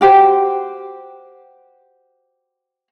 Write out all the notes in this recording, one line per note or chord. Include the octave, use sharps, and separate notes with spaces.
F#4 G4 C5